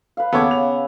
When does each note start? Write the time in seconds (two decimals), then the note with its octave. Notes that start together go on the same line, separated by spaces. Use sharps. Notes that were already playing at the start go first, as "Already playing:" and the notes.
0.17 B4 F5
0.33 D#2 C#3 B3 A4 C#5 E5 F#5 D6
0.51 F7